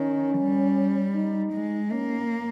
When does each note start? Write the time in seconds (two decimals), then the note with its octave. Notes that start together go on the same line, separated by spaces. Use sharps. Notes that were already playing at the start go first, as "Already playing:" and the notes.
Already playing: D#3 C#4
0.40 G3
1.15 D#4
1.53 G#3
1.91 A#3 C#4